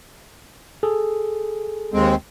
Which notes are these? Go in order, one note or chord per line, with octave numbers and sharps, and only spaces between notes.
G#4 A4
D#2 G#3 C4